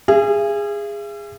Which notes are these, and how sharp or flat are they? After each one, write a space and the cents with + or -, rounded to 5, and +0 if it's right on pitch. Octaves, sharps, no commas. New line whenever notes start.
G#4 -20 E5 +45